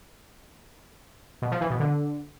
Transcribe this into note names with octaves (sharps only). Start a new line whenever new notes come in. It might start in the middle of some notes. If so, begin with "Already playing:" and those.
B2
F3
E3
B2
D3